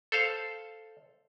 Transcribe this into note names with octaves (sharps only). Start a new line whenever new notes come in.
A4 C5 F5